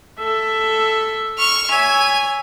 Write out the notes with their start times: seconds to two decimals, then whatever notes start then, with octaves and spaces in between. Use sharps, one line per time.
0.19 A4 E5
1.38 C#6 F6
1.70 C#5 E5 G#5